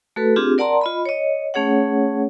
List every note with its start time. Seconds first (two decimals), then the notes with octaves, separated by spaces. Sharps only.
0.16 A3 F#4 A4 B4
0.36 C4 D4 F4 G4 G#4
0.58 A#4 D5 F#5 A5 A#5 C6
0.81 F4 D#5 B5
1.06 C#5 D#5
1.54 A3 C#4 G#4 C#5 F#5